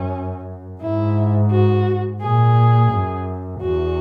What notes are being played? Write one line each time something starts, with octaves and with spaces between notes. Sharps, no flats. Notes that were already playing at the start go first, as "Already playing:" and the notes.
Already playing: F#2 C#4
G#2 E4
F#4
A#2 G#4
F#2
E2 F#4